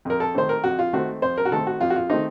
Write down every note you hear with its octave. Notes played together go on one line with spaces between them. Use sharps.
F2 A#4
A4
D#3 A3 C4 C5
A#4
F2 F#4
F4
D#3 A3 C4 F#4
F2 C5
A#4
F#4
D#3 A3 C4 A4
F#4
F2 F4
F#4
F4
D#3 A3 C4 D#4